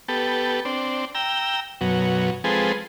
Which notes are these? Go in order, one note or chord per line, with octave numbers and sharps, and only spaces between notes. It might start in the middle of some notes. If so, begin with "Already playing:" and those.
B3 G4 A4
C4 D4
G5 A#5 E6
F#2 B2 F#3
F3 G#3 C4 G#4 A4 B4